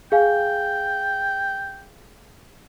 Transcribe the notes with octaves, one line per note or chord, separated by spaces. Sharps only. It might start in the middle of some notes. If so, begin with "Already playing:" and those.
G#4 F5 G5 G#5